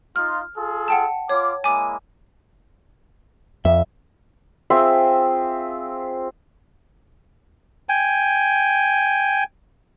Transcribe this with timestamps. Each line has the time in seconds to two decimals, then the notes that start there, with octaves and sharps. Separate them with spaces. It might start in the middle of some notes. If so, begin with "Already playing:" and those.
0.16 D#4 F4 F6
0.56 F4 G#4 A4
0.88 F#5 G5 A5
1.29 F4 C#5 D6
1.64 G#3 A#3 E4 G#5 D6
3.65 F2 E5
4.70 C4 F4 G#4 E5
7.89 G5 G#5